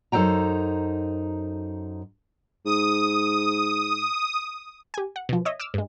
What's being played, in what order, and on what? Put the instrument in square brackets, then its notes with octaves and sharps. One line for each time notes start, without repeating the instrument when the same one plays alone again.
[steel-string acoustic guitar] F#2 D#4 A4 C5 G5 A#5
[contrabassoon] G#2 [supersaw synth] D#6
[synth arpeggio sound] G4 G#5
F#5
B2 F3
C#5 D#5 E5
D6 E6 F6
G2 G#3